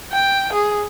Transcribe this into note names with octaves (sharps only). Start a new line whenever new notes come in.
G5
G#4